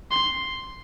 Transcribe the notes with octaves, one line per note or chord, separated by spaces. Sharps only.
C6